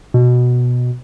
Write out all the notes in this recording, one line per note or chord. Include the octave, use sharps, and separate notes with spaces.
B2